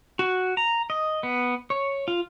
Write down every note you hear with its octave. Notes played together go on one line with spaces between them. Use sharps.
F#4
A#5
D#5
B3
C#5
F4